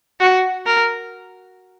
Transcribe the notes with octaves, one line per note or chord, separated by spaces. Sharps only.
F#4
A#4